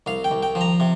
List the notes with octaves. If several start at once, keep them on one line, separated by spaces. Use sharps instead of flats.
C2 F5
G5
C2
G5
F3
A#5
C3